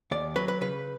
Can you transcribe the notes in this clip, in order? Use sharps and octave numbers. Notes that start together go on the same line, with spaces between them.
D#2 D5
F#3 B4
B4
C#3 B4